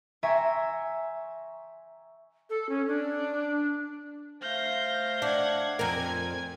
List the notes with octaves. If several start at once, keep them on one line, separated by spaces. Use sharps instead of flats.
E5 G5 G#5 A#5 C6 C#6
A4
C#4
D4
A3 C5 F5 G6 A#6
D4 F#5 G#6
F2 A#4 G#5 G#6